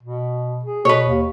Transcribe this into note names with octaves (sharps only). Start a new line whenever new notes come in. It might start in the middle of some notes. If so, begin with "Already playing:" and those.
B2
G#4
B2 B4 C#5
D#2